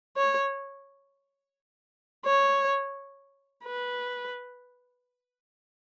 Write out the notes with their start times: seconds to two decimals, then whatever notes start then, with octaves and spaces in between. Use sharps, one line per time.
0.17 C#5
2.26 C#5
3.65 B4